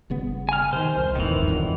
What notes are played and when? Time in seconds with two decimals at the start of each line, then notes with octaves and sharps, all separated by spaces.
0.10 G1 C#3 B3
0.49 G#5 F6
0.73 C3 D#3 C5
0.97 C2 F2
1.15 D#1 G#1 F2 D#3 E3
1.47 F2 D3 F#3